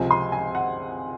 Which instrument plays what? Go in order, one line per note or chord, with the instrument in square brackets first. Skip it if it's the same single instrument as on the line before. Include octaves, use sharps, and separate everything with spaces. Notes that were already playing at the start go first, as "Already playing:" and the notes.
Already playing: [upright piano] C#2 C3 F3 C4 G#5
C6
G#5
F#5